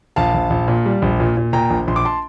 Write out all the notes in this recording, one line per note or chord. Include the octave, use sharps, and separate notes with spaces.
A#1 F5 A5
A#1
A#1
A#2
G3
A#1
A#2
A#2
A#2 G5 A#5
A#1
A#1 C6
D6
A5 C6